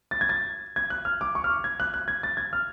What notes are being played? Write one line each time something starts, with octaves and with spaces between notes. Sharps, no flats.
A6
G#6
A6
G#6
F#6
F6
D6
C#6
F6
D6
G#6
F#6
F#6
G#6
A6
G#6
F6